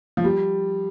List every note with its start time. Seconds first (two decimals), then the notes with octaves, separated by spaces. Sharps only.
0.17 F3
0.24 G3